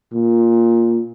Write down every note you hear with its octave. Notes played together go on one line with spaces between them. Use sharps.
A#2